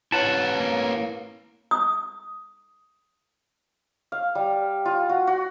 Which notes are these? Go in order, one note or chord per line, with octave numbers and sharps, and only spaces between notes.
E4 B4 C#5 F#5 A5
A#3
D#6
F5
G3
F4
F#4
F#4